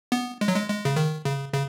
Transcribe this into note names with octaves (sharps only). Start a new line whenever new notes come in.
B3
G#3
F#3
G#3
G#3
C#3
D#3
C#3
C#3